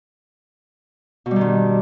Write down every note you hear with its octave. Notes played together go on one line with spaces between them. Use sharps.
B2
G3
D#3
G2